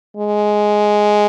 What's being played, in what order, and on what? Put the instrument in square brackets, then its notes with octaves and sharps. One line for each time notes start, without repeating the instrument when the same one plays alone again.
[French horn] G#3